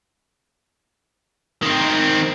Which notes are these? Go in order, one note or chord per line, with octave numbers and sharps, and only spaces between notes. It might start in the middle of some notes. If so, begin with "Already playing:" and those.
D#3 C4